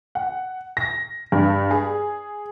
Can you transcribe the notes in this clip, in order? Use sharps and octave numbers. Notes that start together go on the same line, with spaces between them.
F#5
A#6
G2
G#4